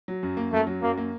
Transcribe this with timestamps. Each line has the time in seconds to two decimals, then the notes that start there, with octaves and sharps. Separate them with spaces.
0.08 F#3
0.23 F#2
0.37 A#3
0.52 F#2 A3
0.67 F#3
0.82 F#2 A#3
0.97 A#3